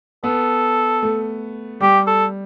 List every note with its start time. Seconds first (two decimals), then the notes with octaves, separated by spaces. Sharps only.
0.24 B3 A4
1.03 A3
1.80 G3 G4
2.07 A4